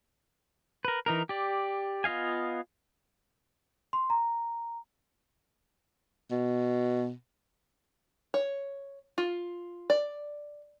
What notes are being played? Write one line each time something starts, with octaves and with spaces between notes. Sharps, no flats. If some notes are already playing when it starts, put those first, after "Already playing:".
A#4 B4
E3 D#4 A#4
G4 D5
B3 F4 D#5 F5 G#5
C6
A#5
B2
C#5
F4
D5